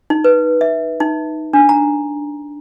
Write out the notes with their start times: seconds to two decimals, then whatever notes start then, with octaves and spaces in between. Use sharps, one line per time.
0.10 D#4
0.24 B4
0.61 E5
1.00 D#4
1.53 D4
1.69 A#5